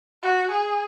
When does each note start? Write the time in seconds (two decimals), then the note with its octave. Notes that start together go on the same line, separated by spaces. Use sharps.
0.23 F#4
0.51 G#4